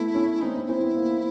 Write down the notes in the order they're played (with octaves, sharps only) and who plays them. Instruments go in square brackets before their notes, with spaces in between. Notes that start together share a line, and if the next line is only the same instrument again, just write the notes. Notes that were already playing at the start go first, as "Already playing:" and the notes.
Already playing: [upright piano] A3 B3 [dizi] E4
[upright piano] C#4
[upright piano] C4 [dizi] D#4
[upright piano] C4
[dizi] D#4
[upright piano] C4 [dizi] E4
[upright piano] B3
A#3